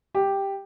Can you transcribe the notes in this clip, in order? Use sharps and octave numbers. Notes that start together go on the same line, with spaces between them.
G4